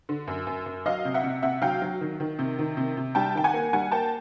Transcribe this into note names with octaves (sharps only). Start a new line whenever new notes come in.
D3
F#2
F#2
F#2
F#3 D#5 F5
C3
E5 F#5
C3
C3 E5 F#5
F#3 F5 G5
F#3
D#3
D#3
C3
D#3
C3
C3
G3 G5 A5
D#3 G5
F#5 G#5
A#3
G3 F#5 G#5
A#3 G5 A5